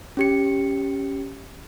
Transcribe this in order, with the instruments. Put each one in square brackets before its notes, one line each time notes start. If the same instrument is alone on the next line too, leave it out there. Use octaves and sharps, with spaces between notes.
[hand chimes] C#4 G4 C#7